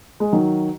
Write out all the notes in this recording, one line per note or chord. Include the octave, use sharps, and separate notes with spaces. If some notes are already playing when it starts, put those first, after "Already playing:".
G#3
D#3 F#3